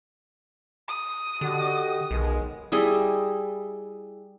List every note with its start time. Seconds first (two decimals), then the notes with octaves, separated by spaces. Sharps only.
0.88 D#6
1.41 D3 F#4 G4 D#5
2.11 B1 D#3 G#3
2.72 G3 E4 G#4 D#5